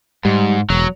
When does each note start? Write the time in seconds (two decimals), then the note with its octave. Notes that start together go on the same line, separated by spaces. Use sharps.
0.25 G#2 G3
0.70 E1 F#3